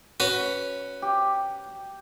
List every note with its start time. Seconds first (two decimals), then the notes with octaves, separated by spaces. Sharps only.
0.20 C#4 F#4 B4
1.02 G4